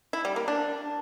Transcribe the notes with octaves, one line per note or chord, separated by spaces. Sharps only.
E4
G3
A#3
D4